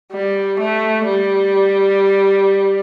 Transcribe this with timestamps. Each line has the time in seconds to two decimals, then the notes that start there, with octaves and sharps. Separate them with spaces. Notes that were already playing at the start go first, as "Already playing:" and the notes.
0.12 G3
0.60 A3
1.05 G3